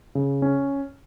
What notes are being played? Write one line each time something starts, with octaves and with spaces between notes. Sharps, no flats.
C#3
C#4